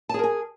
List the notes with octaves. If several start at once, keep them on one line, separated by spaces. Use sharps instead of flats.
G#4 A#4 G#5 A5